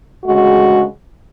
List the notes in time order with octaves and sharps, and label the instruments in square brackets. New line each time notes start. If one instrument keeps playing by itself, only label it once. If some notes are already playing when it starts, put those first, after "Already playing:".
[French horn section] D2 C#3 G#3 F#4